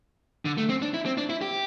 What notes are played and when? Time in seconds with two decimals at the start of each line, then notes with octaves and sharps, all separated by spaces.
0.45 D3
0.58 A3
0.69 C4
0.82 D4
0.94 E4
1.06 C4
1.18 D4
1.30 E4
1.42 G4